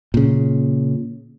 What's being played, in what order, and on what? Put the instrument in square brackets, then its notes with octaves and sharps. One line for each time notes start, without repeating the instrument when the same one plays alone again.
[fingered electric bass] A#2 C#3